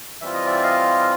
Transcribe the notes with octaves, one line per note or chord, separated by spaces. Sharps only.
E3 G3 C4 F4 E5
D#5
D5 E5
D#5 F5